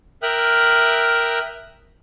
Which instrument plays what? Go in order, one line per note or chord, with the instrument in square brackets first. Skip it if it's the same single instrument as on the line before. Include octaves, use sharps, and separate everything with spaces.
[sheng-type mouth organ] A#4 E5 G5 D#6 F6 F#6